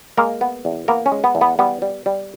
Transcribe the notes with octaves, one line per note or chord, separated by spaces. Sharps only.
G#3 A#3 A#4
B3
E2
A#3 B3 A#4
C#4
G#3
B3
E2
B3
G3 B3
G3
G3